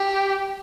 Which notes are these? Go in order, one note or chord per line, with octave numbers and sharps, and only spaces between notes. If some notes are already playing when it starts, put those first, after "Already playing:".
Already playing: G4